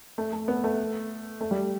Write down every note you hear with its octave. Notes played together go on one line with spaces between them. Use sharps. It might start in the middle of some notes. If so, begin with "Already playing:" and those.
A3
A3
B3
A3
A3
G3